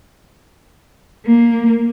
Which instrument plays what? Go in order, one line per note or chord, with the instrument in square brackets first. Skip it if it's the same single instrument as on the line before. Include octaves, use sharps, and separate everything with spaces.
[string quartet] A#3